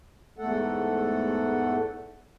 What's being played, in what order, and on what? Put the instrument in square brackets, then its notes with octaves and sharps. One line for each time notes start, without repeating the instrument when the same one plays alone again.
[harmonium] E2 G#2 A3 A4 F#5